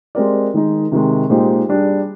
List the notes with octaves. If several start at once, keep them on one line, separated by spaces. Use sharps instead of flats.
G#3 C4 G4 A#4 D5
D#3 G#3 D#4
C3 D#3 G#3
A#2 G#3 D#4 G4 C5
G3 D4 G#4